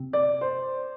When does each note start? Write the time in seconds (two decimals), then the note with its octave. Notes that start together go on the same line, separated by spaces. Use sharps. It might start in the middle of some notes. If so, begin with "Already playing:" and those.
Already playing: C3
0.13 D5
0.41 C5